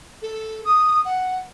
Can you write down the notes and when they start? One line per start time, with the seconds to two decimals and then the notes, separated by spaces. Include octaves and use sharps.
0.22 A4
0.65 D#6
1.05 F#5